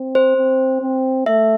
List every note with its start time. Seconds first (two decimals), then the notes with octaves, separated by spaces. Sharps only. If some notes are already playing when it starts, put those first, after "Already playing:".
Already playing: C4
0.15 C5
0.37 C4
0.82 C4
1.26 A3 E5